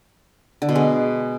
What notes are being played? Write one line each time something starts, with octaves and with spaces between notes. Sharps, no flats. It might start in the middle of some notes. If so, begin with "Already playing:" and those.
D3
B2
G#3